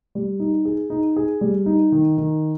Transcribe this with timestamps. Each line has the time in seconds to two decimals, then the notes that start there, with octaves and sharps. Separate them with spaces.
0.15 G3
0.40 D#4
0.65 G#4
0.90 D#4
1.16 G#4
1.41 G3
1.66 D#4
1.92 D#3
2.18 D#3